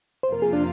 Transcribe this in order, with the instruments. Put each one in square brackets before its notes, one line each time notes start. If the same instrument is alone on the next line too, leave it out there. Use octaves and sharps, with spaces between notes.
[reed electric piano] C5
[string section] F2 C3 F3 A#3 F4 [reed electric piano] A#4
[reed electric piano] G#4
D4